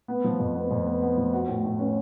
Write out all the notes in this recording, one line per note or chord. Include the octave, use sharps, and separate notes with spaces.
B3
F3
F2
B3
F2
B3
B3
F3
F#4
A2
A2
C#4